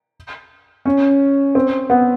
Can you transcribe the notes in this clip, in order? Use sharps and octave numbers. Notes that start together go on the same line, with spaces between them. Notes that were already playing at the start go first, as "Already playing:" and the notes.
C#4
C4
B3